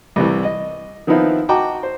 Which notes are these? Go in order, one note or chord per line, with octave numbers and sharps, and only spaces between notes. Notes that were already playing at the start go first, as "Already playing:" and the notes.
C2 C3 E3
D#5
D#3 F3 B3 C4 D#4 E4
F#4 D#5 G5 A5 A#5 D6
C5